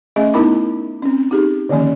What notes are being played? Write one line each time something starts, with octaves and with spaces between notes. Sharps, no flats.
A3 C#4 G#4 D#5 E5
B3 D#4 E4 A#4 B5 D6
C4 C#4
D#4 G4 G#4
D3 D#3 F3 A#3 C#4